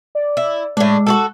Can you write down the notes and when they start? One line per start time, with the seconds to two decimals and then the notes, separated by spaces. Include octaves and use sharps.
0.15 D5
0.37 E4
0.77 A2 G#3 D4
1.07 F#4 G#4 A4